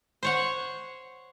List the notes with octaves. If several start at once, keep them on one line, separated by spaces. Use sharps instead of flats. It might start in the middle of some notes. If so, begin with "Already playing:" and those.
C5 C#5 F#5